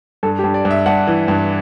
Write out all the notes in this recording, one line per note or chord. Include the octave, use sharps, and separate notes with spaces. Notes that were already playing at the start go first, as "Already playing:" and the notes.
G2 A4
G4
G2
D5
G2
E5
G2 F#5
E3
G2